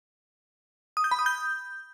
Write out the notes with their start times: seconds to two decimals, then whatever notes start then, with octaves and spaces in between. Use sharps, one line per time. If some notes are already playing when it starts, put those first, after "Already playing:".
0.97 D#6
1.04 G6
1.11 B5
1.19 D#6
1.26 G6